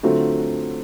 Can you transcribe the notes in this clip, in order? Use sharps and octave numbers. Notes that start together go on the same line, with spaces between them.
D3 F#3 A3 C4 F4